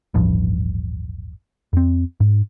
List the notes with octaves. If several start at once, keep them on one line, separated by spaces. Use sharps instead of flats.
D#1 A1 G2 F3
F2 C4
G#2